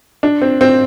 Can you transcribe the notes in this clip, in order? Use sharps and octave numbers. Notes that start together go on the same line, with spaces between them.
D4
C4
C4